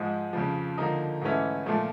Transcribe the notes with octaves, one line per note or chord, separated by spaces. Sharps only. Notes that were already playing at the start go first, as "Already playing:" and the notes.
Already playing: G#2 F3 G#3
F2 C#3 F3
D3 F3 A#3 D#4
G#2 E3 A3 C#4 E4
A#2 F3 A3